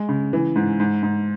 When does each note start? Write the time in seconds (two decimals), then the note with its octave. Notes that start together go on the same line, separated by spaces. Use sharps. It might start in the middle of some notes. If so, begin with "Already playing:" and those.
Already playing: G#3
0.09 C#3
0.33 E3
0.56 G#2
0.80 G#2
1.03 G#2